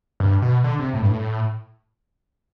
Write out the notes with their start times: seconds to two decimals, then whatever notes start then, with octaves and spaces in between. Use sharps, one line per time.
0.20 G2
0.42 B2
0.64 D3
0.79 C3
0.94 A2
1.02 G2
1.09 A2